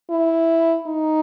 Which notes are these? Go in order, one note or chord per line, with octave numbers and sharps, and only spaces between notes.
E4
D#4